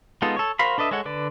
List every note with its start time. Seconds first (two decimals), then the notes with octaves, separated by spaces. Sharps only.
0.22 G#3 B3 D#4 F4 A4
0.37 A4 C#5
0.59 F#4 A#4 C5 F5 B5
0.78 D4 A4 B4 D#5 E5
0.91 G#3 A4 C#5 F#5
1.05 D3 B4 D5